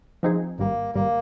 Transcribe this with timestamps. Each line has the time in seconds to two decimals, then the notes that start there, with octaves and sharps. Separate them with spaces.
0.23 F3 C4 D#4 G#4
0.58 G#1 G2 G3 A#3
0.94 G#1 G2 G3 A#3